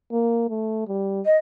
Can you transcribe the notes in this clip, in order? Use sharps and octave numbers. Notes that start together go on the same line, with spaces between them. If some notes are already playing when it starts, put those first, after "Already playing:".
A#3
A3
G3
D#5